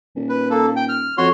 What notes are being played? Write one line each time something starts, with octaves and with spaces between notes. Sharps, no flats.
D#1
B4
A#3 A4
G5
F6
F2 F#4 C#5 C6